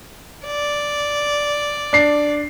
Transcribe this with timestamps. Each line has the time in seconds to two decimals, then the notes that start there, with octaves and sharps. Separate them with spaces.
0.46 D5
1.93 D4 C7